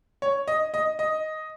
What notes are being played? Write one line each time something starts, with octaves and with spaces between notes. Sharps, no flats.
C#5
D#5
D#5
D#5